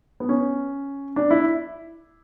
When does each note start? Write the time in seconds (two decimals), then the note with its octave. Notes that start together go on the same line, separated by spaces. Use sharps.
0.20 B3
0.29 C#4
1.16 D4
1.31 E4